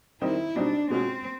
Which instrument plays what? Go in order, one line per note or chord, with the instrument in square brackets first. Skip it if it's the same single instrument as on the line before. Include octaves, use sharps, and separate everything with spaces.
[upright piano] D#3 G3 C4 D#4 [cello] E4
[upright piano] B2 G3 C4 D#4 [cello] D4
[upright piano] B2 G#3 C#4 F#4 [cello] C4